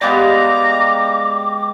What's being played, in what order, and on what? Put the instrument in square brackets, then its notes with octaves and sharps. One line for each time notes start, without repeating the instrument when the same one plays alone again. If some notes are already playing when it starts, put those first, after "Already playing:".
[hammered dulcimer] G#3 B3 G4 [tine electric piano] D5 F5 [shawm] A#5 [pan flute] D6